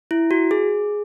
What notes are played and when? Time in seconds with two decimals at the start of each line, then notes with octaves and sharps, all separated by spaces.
0.11 E4
0.31 F#4
0.51 G#4